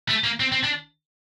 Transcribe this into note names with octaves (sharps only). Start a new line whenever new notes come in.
A3
A#3
C4
C4
D4